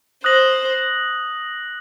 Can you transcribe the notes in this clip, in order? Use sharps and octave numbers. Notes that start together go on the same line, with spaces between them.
C5 D#6 F#6 A#6 F#7